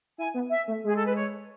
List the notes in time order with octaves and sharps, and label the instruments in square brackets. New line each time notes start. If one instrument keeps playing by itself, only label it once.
[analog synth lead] E4 [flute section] G#5
[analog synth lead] B3
[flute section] E5
[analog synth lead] A3
[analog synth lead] G#3 [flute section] G#4
[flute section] A4
B4
C#5